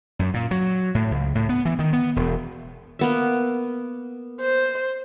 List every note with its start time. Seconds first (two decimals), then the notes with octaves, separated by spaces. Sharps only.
0.19 F#2
0.34 A#2
0.51 F#3
0.95 A2
1.11 C#2
1.35 A2
1.49 B3
1.65 E3
1.79 D#3
1.93 B3
2.16 E1
2.99 A#3 B3 E5
4.40 C5